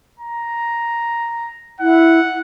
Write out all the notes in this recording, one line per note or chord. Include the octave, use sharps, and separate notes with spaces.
A#5
E4 F#5